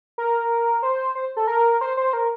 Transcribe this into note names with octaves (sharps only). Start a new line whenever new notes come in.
A#4
C5
C5
A4
A#4
C5
C5
A#4